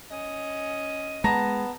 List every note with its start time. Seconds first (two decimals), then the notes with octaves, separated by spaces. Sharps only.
0.11 C#4 D#5
1.24 G#3 B3 A5 A#5 A#6